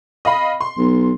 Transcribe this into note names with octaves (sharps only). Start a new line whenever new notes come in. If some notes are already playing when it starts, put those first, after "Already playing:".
D#5 F5 B5
C6
B1